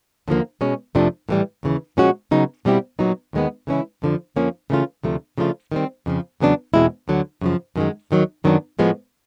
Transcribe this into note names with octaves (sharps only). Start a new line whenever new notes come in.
D#2 D3 F3 A#3
B2 G#3 C#4
F2 C3 F3 A3 D4
A2 E3 G3
D#2 C#3 E3
A#2 F3 G#3 C#4 F#4
C#3 F#3 B3 D#4
B2 G3 C4 E4 G4
A#2 F#3 B3 D#4
D#2 D#3 G#3 B3
C#3 E3 G#3 C#4 E4
F2 D3 F3
F2 D3 F3 A#3 C#4
C#3 E3 A3 C#4 F4
D2 C3 F3 A3
C#3 F3 A3 D4 F4
D#3 G3 C4
F2 C#3 F3
E2 C#3 F#3 B3 D4
E2 B2 G#3 C4 E4
D2 D3 F#3
F#2 C#3 F3
F#2 D#3 G#3
D#2 D#3 F#3
F#2 D#3 F#3 B3 D4
A2 F3 G#3 B3